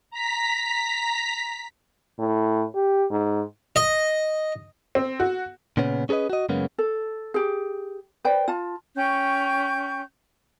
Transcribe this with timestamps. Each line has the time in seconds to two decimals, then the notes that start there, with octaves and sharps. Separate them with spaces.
0.11 A#5 B6
2.19 A2
2.75 G4
3.11 G#2
3.76 D#5
4.95 C4
5.20 F#4
5.77 A#2 C#3 B3 C#4
6.09 C#4 G#4 A4 B4 D#5
6.30 F#4 D#5
6.49 F#2 C#3 G#3 A#3 B3 C#4
6.78 A4
7.34 G4 G#4
8.25 B4 C5 D5 G5
8.48 F4 A5
8.96 C#4 G5 C#6 G6